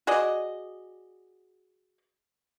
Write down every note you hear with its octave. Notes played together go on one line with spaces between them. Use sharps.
F#4 G#4 D5 D#5